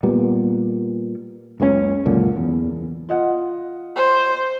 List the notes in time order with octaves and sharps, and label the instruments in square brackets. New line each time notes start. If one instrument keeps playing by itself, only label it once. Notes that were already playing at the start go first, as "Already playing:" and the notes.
[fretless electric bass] A#2 G3 B3
F#1 C#2 C#3 C#4
C#2 F#2 A#2 D3
E2
[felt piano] F4 D#5 F#5
[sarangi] C5